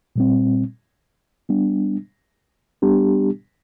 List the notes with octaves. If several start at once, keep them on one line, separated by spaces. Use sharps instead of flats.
A#2 G3 C4
G3 B3 D4
G3 B3 D4 G4